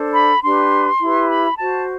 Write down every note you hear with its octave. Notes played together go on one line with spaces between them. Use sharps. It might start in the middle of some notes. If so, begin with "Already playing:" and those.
Already playing: D4 A4 C5
B5
D4 G4 B4 C6
E4 G4 B4
B5
F#4 C5 A5